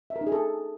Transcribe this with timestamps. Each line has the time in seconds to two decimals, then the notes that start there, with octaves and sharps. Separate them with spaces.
0.10 E5
0.16 A#4
0.21 D#4
0.27 G#4
0.32 A4